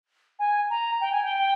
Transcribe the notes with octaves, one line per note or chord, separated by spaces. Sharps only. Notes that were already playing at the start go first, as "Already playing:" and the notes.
G#5
A#5
G5
G#5
G5